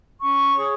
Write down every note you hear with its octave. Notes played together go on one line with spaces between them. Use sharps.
C#4 C#6
G#4 C#5